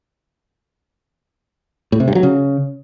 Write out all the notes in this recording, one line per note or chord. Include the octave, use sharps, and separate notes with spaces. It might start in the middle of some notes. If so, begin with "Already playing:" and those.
A2
C3
G2
F#3
C#3